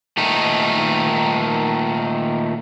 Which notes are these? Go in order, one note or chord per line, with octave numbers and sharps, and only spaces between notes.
A#2 D#3 A3 D#4